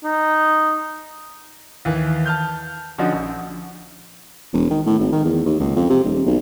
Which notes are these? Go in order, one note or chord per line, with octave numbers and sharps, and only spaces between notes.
D#4
D#2 E3
A5 F6 G6
D3 F3 C#4 D#4 F#4
A#1
E1
D#3
A2
G#1
D#3
E2
D#2
C#2
F2
C3
D#1
B1